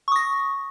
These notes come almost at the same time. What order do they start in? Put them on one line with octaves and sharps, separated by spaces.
C#6 D#6 A#6